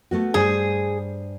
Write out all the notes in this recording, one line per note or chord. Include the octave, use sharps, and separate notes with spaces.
A3 B3 F#4
G2 G#4 C5